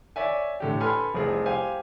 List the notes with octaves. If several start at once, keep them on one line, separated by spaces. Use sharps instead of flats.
C#5 D5 E5 G#5
A2 D3 G4
A4 B4 G#5 B5 C6 F6
F1 C2 F3 G#4
G4 C5 F5 G#5